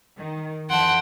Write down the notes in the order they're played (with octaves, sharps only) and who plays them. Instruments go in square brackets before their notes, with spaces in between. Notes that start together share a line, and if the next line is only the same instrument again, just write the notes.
[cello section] D#3
[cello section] F2 E3 [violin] F#5 A5 [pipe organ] G5 C6